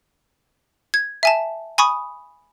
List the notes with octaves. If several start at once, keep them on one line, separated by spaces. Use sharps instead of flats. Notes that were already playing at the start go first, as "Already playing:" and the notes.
G#6
E5 G#5 A5
G#5 B5 C#6 D#6